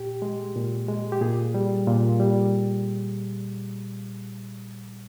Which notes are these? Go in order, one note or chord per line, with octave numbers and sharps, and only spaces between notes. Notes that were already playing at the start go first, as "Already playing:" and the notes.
Already playing: A#2 G4
G#3
A#2
G#3
G4
A#2 G#4
G3
A#2
G3